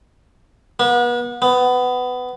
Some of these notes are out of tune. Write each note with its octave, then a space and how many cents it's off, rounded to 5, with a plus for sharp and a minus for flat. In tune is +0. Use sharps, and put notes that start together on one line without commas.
B3 -35
B3 +20